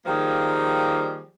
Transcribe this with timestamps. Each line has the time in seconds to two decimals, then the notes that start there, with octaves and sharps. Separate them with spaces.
0.06 D#3 F3 G3 A#3 G#4